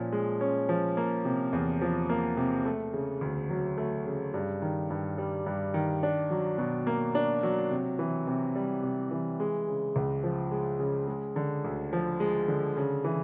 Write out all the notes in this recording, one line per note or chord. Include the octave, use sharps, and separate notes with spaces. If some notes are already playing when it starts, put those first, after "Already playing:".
Already playing: A#2 F3 C#4
G#3
C#4
F3
A#3
C3
E2
F3
A#3
C3
A3
C#3
D2
F#3
A3
C#3
G2
D#3
G2
G3
G2
D#3
D4
F#3
B2
A#3
D4
F#3
C3
E3
C3
G3
C3
E3
G#3
C#3
C#2
F3
G#3
C#3
G#3
D3
D2
F3
G#3
D3
C#3
E3